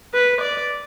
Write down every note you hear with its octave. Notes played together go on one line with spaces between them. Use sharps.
B4
D5